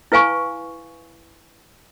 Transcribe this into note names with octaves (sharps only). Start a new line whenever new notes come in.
E4 B4 F5 G#5 C#6